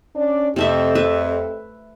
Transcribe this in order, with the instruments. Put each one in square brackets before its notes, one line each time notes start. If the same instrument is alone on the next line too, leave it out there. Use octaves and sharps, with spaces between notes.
[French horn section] C#4 D4 D5
[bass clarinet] F2 [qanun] C3 A3 E5 [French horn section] C4 G4 A4
[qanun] B4 E5